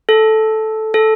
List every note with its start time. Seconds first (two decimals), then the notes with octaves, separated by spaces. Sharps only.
0.09 A4
0.94 A4